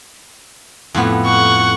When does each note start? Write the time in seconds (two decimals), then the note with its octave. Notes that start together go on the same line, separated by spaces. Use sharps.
0.95 F2 A2 B3
1.25 F#5 C#6